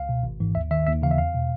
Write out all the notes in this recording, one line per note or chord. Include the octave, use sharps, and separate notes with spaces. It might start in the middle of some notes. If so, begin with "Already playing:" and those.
Already playing: C#2 F5
B2
G#1
G#2 E3
D#2 E5
D#3 E5
D#2 E5
C#3 E3 F5
E5
E2 F5
B2